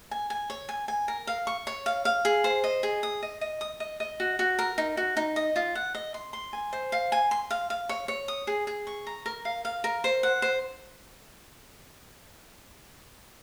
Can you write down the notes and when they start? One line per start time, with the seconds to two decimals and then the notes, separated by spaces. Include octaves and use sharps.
0.11 G#5
0.30 G#5
0.50 C#5
0.69 G#5
0.88 G#5
1.08 A#4
1.27 F5
1.47 C#6
1.67 C#5
1.86 F5
2.05 F5
2.25 G#4
2.44 C5
2.64 D#5
2.83 G#4
3.03 D#6
3.22 D#5
3.41 D#5
3.61 D#6
3.80 D#5
4.00 D#5
4.20 F#4
4.39 F#4
4.59 A#4
4.78 D#4
4.97 F#4
5.17 D#4
5.36 D#5
5.56 F4
5.75 F#5
5.95 D#5
6.14 C6
6.33 C6
6.53 G#5
6.73 C5
6.92 F5
7.12 G#5
7.31 C6
7.50 F5
7.70 F5
7.89 C#5
8.08 C#5
8.28 D#6
8.47 G#4
8.67 G#4
8.87 C#6
9.07 A#5
9.26 A#4
9.45 F5
9.65 F5
9.84 A#4
10.04 C5
10.23 F#5
10.42 C5